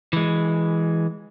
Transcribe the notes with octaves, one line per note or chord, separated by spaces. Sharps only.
E3 G#3